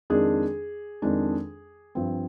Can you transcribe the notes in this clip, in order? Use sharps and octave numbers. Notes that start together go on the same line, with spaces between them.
F2 D#3 G#3 D4 G#4
F2 D#3 G#3 D4
G2 F3 C4